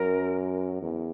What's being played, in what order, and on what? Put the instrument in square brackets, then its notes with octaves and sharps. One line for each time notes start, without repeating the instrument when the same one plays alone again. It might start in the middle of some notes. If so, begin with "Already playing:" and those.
Already playing: [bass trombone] F#2 [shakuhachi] A#4
[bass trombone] E2